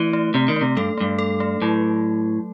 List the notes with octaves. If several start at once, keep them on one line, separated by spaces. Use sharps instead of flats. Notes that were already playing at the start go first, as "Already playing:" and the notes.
Already playing: E3 A3
A3
C3 A3
D#3
C3 A3
G2 A4
G2 A3
A4
A3
A2 F#3